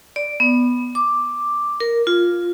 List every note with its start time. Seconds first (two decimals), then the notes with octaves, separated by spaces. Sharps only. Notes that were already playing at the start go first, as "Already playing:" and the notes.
0.16 D5
0.40 B3
0.95 D6
1.80 A#4
2.07 F4